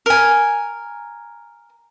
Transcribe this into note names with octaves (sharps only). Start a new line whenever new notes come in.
A#4 G#5